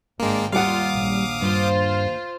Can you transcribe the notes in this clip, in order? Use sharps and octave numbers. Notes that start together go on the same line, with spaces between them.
G#1 G#3 A#3 D4 G5
D#2 G3 F4 F5 F#5 D6 D#6
A#1
G2 F4 C5